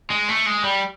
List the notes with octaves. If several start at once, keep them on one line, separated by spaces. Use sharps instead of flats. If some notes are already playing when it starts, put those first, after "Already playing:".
G#3
A3
G#3
G3